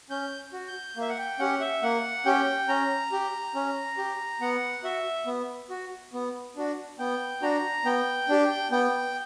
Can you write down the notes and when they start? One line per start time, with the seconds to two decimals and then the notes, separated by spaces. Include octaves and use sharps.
0.10 C#4 G6
0.53 F#4
0.68 G6
0.97 A#3 E5
1.09 F#5
1.18 G5
1.39 C#4 G4 F#5
1.61 E5
1.83 A#3 F#5
2.25 C#4 G4 G5
2.68 C#4 A#5
3.12 G4
3.55 C#4
3.98 G4
4.41 B3 F#5
4.84 F#4 E5
5.27 B3
5.70 F#4
6.14 B3
6.57 D4 F#4
6.99 B3 G5
7.42 D4 F#4 A#5
7.85 B3 G5
8.29 D4 G4
8.71 B3 G5